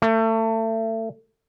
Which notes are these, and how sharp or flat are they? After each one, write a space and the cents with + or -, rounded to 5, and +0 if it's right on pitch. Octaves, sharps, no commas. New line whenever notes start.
A3 +30